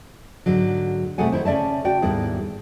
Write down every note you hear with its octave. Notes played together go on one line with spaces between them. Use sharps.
G#2 D3 F#3
C3 G3 A3 G#4 F#5 G#5
D#3 E4 C5
C#3 C#4 D5 E5 A5
F#4 D5 G5
D#2 G#2 G3 B3 E4 G#4